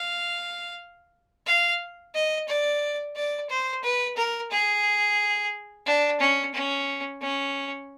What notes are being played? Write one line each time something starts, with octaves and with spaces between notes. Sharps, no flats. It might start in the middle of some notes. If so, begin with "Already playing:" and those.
Already playing: F5
F5
D#5
D5
D5
C5
B4
A#4
G#4
D4
C#4
C#4
C#4